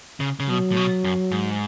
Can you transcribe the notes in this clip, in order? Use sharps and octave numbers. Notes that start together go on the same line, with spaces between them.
C#3
C#3
B2 F#3
A2
B2
F#2
G#2